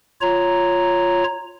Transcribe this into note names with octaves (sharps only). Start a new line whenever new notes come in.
F4 C#5 A#5